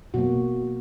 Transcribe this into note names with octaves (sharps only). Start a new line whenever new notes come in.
B2 F#3 A#3 F#4